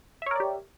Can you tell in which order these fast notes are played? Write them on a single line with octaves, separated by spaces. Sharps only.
E5 C#5 A#4 D5 G4